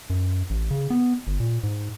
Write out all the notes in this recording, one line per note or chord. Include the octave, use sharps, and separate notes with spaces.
F#2
A1
C#3
B3
G1
A#2
G#2